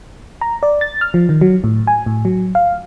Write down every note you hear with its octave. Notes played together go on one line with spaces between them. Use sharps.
A#5
D5
A6
F6
F3
D#3
F#3
A2
G#5
A2
F#3
F5